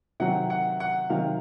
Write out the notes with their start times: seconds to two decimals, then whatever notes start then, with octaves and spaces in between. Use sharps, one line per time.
0.20 C3 D#3 F#3 F#5
0.50 F#5
0.80 F#5
1.10 C3 D#3 F#3 F5